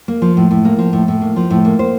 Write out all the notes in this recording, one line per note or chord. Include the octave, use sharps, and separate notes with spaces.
A#3
F3
A2
A2
A#3
F3
A2
A2
A#3
F3
A2
A#3
C5